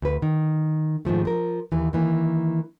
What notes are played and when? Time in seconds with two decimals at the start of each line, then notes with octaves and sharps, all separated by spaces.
0.02 D2 B4
0.22 D#3
1.05 G#2 D#3 F3 A3
1.25 F3 A#4
1.72 D#2 E3
1.93 D#3 E3 A#3